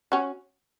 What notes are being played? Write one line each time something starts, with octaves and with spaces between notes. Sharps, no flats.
C#4 F#4